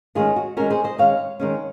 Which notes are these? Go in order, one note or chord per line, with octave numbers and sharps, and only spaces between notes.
D#3 G#3 C#4 F4 G#4
F#4
D#3 G#3 C#4 F#4 A#4
G#4 C5
C5 D#5
D#3 G#3 C#4 C#5 F5
D#3 G#3 C#4